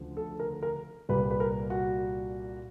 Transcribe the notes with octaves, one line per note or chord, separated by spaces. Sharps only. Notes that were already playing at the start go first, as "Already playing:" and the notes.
Already playing: D2 C#3 F3
A4
A#4
A#4
C2 A#2 G3 B4
B4
A#4
F#4